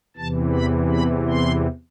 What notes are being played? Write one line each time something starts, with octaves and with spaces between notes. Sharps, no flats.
E2 C3 E3 A5
B5
B5
C6